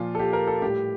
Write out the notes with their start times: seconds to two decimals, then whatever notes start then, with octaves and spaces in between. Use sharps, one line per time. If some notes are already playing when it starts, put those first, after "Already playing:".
Already playing: A#2 F3 F4
0.15 A4
0.19 G4
0.33 A#4
0.47 A4
0.62 A2 G3 G4